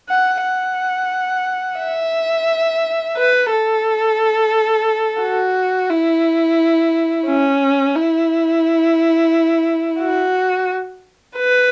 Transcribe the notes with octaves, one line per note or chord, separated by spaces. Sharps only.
F#5
F#5
E5
B4
A4
F#4
E4
C#4
E4
F#4
B4